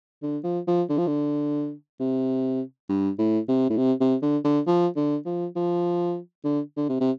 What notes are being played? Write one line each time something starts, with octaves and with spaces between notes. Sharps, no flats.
D3
F3
F3
D3
F3
D3
C3
G2
A2
C3
A2
C3
C3
D3
D3
F3
D3
F3
F3
D3
D3
C3
C3